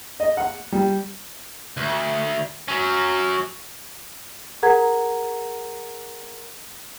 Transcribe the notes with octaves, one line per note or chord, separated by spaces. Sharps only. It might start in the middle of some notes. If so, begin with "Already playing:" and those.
D#5
F#5
G3
D2
F#3 C#4
G#4 A#4 F#5 A#5 G#6